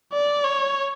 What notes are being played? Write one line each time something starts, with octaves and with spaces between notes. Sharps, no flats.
D5
C#5